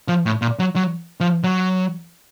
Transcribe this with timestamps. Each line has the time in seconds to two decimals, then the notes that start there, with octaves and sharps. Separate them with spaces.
0.08 F3
0.26 A2
0.42 A#2
0.59 F#3
0.76 F#3
1.20 F3
1.44 F#3